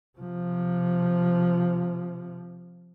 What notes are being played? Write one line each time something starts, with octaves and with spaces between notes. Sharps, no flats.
C3 F3